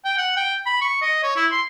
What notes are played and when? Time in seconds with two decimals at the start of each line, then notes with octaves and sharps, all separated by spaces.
0.05 G5
0.18 F#5
0.36 G5
0.66 B5
0.81 C#6
1.02 D#5
1.23 C#5
1.36 E4
1.52 C6